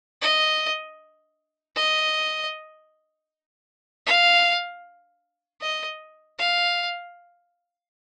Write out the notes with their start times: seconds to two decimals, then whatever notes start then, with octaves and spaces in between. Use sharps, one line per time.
0.22 D#5
1.76 D#5
4.07 F5
5.62 D#5
6.39 F5